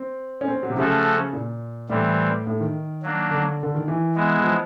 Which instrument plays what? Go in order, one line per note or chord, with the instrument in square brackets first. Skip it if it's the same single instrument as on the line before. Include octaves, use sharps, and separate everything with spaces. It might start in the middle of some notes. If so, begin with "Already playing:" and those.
Already playing: [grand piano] C4
C#4
C4
F#3
C3
[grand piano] C#3 [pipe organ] F3 A3 C#4 F#4 A4
[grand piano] A#2
[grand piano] A2 [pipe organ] E3 G3 C4
[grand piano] A2
D#3
[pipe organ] F#3 A#3 D4
[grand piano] D3
D3
D#3
E3
[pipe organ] G#3 B3 E4
[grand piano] E3
F3